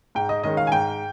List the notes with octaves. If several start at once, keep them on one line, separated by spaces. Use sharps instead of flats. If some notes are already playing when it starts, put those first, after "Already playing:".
G#2 G5
D#5
D#3 G#3 C#4 D#5
F5
G#5
G#2 G5